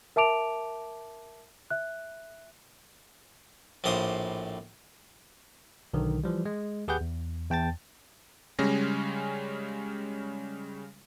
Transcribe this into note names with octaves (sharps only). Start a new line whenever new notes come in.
A#4 E5 A5 D6 D7 F7
E5 F#6
A#1 A2 F3 C6 D6 D#6
B1 D3 D#3
E3 F3 G3
G#3
D#2 G4 G#4 B4 F#5 G6
E2
E2 G5 A5 A6
C#3 G3 G#3 C#4 A#6